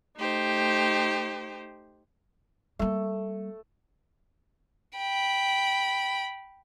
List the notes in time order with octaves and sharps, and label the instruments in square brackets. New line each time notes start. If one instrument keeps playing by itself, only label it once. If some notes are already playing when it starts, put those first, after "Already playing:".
[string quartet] A3 D#4 G4 C5
[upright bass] G3 A#3 [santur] A3
[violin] G5 B5